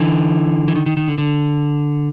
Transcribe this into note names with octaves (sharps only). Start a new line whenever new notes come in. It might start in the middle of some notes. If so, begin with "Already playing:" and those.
Already playing: D3 E3
E3
D#3
D#3
D#3
D3
D3